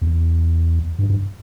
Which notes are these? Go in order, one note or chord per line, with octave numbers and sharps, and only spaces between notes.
E2
G2
G2